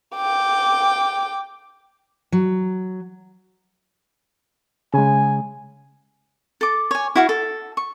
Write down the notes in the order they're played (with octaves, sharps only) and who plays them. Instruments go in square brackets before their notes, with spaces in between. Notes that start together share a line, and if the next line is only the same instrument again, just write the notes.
[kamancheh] G5 D6
[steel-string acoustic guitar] F#3
[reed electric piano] C#3 G#3 [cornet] G#5
[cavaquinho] A4 D6
C#5 G#5
E4 F#4 F5
A4
C#6